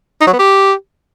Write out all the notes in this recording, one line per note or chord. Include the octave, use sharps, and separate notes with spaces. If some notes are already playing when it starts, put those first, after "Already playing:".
D#4
F#3
B3
G4